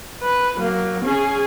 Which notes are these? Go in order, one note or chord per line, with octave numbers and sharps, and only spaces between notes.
B4
F#3 A#3
C#4 G#4